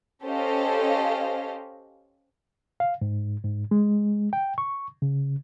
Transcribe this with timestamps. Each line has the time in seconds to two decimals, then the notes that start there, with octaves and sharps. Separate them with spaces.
0.24 C#4 G4 A4 C5 D#5 F5
2.80 F5
3.02 G#2
3.44 G#2
3.71 G#3
4.33 G5
4.58 C#6
5.02 C#3